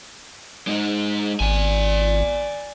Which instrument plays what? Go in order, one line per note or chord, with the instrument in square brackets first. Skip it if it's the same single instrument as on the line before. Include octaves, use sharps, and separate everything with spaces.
[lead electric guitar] G#3 D#4
[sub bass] G#1 [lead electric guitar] D5 G#5